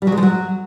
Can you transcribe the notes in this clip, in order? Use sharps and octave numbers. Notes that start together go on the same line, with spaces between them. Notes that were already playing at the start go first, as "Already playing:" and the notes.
G3
F#3
G#3
F3
F#3